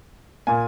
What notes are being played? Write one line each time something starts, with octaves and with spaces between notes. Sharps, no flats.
A#2 A#3 G#5